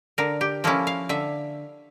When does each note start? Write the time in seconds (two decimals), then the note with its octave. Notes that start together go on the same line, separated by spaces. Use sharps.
0.18 D3 A#4
0.41 G4
0.64 F3 A#3 C#4 E4 A4
0.87 F5
1.09 D3 E5